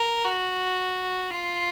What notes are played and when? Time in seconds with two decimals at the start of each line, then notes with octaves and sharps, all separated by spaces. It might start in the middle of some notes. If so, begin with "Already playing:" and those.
Already playing: A#4
0.24 F#4
1.31 F4